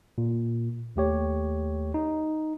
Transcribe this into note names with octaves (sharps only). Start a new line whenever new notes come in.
A#2
D#2 A3 G4 C#5
D#4